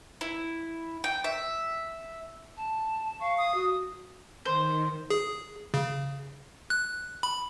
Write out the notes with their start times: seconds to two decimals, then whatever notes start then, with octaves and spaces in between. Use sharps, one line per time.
0.21 E4
1.04 G5
1.24 E5
2.57 A5
3.20 F5 C#6
3.38 D#6
3.54 F#4
4.45 D#3 C5
5.10 G#4
5.74 C#3
6.70 F#6
7.23 B5